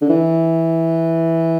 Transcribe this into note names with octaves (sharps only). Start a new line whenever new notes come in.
D3
E3